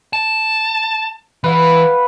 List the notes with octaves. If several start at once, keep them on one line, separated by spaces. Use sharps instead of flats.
A5
E3 B4 F5 F#5